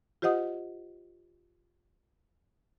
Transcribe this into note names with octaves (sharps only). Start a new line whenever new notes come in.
F4 G4 C5 D#5 F#5 D#6